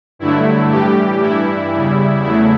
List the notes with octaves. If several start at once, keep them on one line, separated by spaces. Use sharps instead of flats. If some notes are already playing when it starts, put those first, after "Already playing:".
G2 D3 F#3 A3 E4
A2 E3 G3 G4
G2 E3 G3 E4
E2 C#3 G3
E2 C#3 F#3 A3 E4